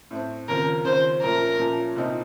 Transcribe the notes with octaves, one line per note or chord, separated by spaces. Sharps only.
A2 A3 C4
D#2 C#3 F3 C4 A#4
D#2 C#3 F3 C4 C5
A#2 F3 A3 C#4 A#4
A#2 F3 A3 C#4
C2 A#2 A3 C4 D#4